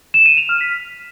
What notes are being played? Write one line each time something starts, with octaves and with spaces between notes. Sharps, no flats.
E7
D#7
F7
F6
B6